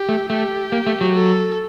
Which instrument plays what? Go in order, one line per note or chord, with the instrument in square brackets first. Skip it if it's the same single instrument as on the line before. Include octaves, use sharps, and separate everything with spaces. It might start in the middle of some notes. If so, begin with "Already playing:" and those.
Already playing: [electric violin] G4
[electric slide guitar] A3
[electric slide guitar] A3 [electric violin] G4
[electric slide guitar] A#3
A3
F#3
[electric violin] A4